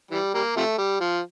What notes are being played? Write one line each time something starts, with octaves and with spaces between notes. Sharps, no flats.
E3 G3
G3 A#3
C3 F3 A3
G3
F3